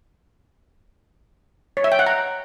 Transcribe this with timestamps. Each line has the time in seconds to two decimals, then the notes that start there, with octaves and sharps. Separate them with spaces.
1.77 C#5
1.84 E5
1.92 G5
1.99 F#5
2.06 A#5